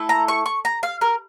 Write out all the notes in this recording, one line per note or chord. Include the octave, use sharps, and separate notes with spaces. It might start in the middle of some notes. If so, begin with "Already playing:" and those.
Already playing: A3 E4 A4
A#5
C#6
C#6
A#5
F5
A#4